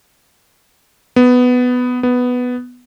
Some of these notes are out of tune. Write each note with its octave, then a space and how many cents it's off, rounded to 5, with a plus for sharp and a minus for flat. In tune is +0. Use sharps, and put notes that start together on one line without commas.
B3 +10
B3 +5